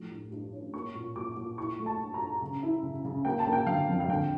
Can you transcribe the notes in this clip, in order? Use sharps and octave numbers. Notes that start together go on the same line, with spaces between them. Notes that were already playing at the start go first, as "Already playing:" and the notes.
Already playing: A2 F3
G2
G2
C#4
A#3 C#6
A#2
A#2 D6
A#2
E4 C#6
A3
A5
G2
A#5
G2
C#3
E4
C#3
C#3
A#3 G5
A5
A#3
G5
D3 F5
F2
F5
D3 G5